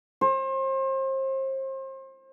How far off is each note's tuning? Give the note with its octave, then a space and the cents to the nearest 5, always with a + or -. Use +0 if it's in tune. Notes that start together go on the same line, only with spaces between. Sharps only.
C5 +35